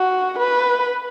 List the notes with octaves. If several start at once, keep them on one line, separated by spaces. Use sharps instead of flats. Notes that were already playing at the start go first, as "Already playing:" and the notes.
Already playing: F#4
B4